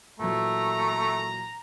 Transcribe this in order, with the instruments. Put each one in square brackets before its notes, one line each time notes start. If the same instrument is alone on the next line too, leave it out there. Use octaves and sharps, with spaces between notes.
[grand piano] A#2 E3 F#3 [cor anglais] A3 [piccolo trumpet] A#5